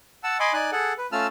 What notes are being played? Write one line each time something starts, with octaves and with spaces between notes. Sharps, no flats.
F#5 A5 E6
D#5 G#5 B5 C6 D6
D#4 D5 G#5 F#6
G#4 A4 F#5
B4
A3 C#4 F4 A5 E6 F6